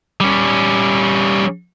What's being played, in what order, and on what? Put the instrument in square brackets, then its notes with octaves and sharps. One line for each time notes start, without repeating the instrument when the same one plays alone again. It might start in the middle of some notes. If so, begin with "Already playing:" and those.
[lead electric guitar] G3 C#4